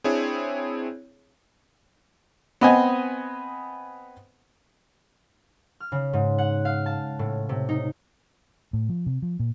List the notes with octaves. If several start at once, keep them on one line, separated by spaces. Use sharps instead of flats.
C4 D4 E4 G#4 C#5
B3 C4 D#5 F#5 G#5
F6
C#3
G#2
F#5
F5
A5
A2
C3
D#4
A2
F3
C3
F3
A#2